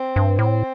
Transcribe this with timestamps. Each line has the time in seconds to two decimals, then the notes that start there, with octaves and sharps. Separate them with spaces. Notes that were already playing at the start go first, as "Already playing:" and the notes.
Already playing: C4
0.16 G2
0.39 A2 C4